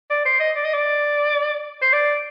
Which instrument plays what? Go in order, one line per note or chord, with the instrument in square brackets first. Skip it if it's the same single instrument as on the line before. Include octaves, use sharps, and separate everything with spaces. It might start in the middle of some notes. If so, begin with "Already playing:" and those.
[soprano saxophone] D5
C5
D#5
D5
D#5
D5
C5
D5